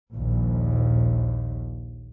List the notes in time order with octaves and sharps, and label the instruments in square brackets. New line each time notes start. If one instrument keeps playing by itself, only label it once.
[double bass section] A#1 D#2